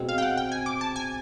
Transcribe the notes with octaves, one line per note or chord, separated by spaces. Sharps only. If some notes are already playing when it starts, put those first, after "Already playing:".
Already playing: B2 G#3 C4
F5
G5
F#5
G5
G#5
D6
A5
G#5